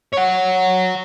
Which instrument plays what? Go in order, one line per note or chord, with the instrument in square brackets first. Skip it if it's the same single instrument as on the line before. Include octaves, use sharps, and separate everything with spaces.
[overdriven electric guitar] C#5 F#5